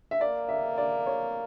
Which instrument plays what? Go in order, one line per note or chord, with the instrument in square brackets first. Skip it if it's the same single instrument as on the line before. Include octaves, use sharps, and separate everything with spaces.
[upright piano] E5
[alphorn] A#3 [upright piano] D5
[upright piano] E5
D5
C#5